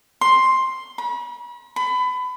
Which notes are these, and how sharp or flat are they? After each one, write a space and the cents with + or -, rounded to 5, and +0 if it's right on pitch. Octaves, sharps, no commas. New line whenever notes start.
C6 +5
B5 -40
B5 +25